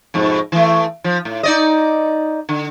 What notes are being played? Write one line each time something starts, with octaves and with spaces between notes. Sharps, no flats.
F2 G#2 B2
E3 A3
F3
A2
D#4 D5 D#5
D3